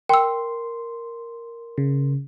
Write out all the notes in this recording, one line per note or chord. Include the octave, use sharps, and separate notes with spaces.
A#4 G5 C6 E6
C#3